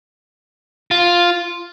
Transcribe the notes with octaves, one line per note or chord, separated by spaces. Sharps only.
F4